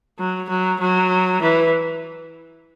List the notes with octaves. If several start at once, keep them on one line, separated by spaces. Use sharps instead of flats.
F#3
F#3
F#3
E3